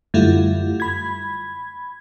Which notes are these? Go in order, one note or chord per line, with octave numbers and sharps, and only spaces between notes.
F#2 D3 G3 A3 E4 F4
B5 G#6